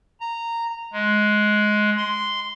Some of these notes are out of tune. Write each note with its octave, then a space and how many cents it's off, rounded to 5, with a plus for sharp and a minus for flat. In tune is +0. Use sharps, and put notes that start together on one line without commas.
A#5 -10
G#3 +15
C6 -10